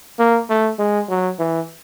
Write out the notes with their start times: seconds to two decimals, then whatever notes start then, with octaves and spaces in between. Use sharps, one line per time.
0.19 A#3
0.49 A3
0.79 G#3
1.09 F#3
1.39 E3